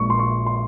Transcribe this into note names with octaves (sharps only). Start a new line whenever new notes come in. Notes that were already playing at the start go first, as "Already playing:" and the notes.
Already playing: A#1 A#2 G#3 C#6
C6
C#6
C6